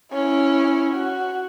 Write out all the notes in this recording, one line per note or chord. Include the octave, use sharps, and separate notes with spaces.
C#4 E4
F#4